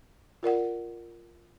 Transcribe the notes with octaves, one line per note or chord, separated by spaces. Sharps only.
F4 A#4 D5 F#5